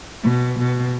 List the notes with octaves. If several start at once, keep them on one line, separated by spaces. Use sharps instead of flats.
B2
B2